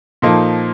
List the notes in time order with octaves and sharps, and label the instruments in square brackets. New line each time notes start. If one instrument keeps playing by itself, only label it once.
[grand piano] A#2 F3 A#3 D#4 A4